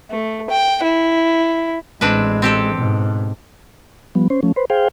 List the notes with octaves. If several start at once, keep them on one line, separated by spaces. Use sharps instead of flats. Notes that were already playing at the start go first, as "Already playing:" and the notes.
A3
G5
E4
A1 G#3 C4 D4 B4
C4 G4 A4
G#2 B2
F3 G3 B3
C#4 C5
F3 A3 C#4
B4 C5
G#4 C5 F5 G5